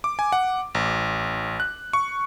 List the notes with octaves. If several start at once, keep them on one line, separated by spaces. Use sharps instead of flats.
D6
G#5
F#5
A1
F#6
C#6